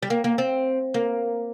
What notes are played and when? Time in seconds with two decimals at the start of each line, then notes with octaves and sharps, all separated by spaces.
0.03 G3
0.10 A#3
0.24 A#3
0.38 C4
0.94 A#3